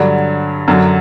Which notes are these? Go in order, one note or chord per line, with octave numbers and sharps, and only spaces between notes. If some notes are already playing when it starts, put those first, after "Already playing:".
Already playing: G2 D3 F#3 D4
F#2 D3 F#3